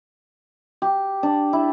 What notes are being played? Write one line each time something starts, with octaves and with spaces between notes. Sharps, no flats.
G4
D4
E4